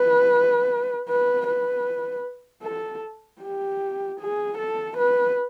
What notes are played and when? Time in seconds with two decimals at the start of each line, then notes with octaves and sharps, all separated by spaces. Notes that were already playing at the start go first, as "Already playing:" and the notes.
Already playing: B4
1.09 B4
1.47 B4
2.63 A4
3.42 G4
4.20 G#4
4.58 A4
4.97 B4